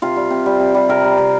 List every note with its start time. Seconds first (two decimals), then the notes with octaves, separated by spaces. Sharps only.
0.02 C3 F4
0.16 G3
0.30 C3
0.46 G3
0.60 C3
0.75 G3
0.89 C3 A#4
1.05 G3
1.18 C3